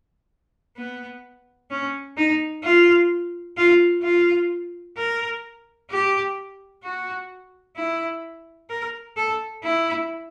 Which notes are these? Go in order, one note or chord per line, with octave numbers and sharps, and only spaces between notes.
B3
C#4
D#4
F4
F4
F4
A#4
G4
F#4
E4
A#4
A4
E4